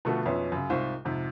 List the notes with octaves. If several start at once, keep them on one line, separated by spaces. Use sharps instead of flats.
B2 D3 F3 A3 F#4 A4
B1 F2 B3 C#4 E5 C6
F#2 C#3
C2 G#2 F4 C5 C#6
F2 G#2 C3